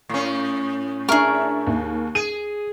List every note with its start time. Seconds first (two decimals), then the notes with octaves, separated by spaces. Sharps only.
0.09 A2 C#4
1.09 D4 G#4 A#4 E5 C#6
1.67 D#2
2.15 G#4 D#7